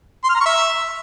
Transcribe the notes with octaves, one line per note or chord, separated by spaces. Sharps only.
C6
F6
A#5
C#6
E5